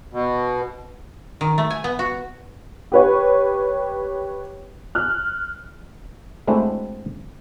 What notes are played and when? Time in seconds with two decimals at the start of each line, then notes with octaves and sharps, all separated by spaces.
0.13 B2
1.41 D#3
1.58 A3
1.70 G#5
1.84 B3
1.99 F#4
2.92 G4 B4 C#5
4.95 F6 F#6
6.47 G#3 A3 C4 D4 E4 F#4